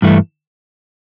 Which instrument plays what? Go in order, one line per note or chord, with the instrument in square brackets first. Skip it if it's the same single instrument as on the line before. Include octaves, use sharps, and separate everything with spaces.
[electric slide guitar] G2 E3 A3